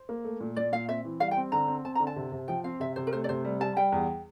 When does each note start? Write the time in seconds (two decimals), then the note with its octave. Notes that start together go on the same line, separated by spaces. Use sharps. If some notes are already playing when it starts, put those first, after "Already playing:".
Already playing: C5
0.09 A#3
0.24 A3
0.40 A#2
0.56 A#2 D5
0.72 A#2 F5
0.88 C4 E5
1.05 E3
1.20 G3 F5
1.31 G5
1.37 C4
1.52 D3 A#5
1.68 C4
1.85 C4 A5
1.95 D3 A#5
2.07 A5
2.16 C3
2.32 C3
2.48 F3 G5
2.64 C4 F5
2.80 C3 E5
2.96 C3 C5
3.07 A#4
3.13 A3 C5
3.24 D5
3.29 C3 C5
3.45 G3
3.60 G3 A5
3.76 G3 G5
3.92 E2